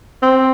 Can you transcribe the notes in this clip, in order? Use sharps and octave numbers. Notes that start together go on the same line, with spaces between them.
C4